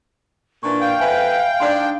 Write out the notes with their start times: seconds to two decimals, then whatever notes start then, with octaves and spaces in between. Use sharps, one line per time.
0.63 A#2 E3 D4 C#6
0.81 F5 G5
1.00 F2 B4 E5 G#5
1.60 G#2 D4 C6